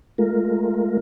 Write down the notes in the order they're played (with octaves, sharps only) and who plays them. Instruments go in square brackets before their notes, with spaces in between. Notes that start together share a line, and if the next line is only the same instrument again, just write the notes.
[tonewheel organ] G#3 A3 F4 A#4